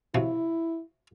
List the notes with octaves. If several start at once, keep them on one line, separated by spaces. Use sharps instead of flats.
C3 F3 F#3 E4